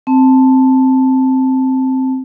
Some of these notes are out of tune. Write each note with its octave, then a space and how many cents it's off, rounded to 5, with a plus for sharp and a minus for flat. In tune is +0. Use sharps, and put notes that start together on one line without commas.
C4 +0 A5 +0